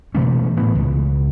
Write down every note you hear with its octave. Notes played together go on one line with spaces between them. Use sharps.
B2 E3 A3 C#4
A2 E3 B3
C#2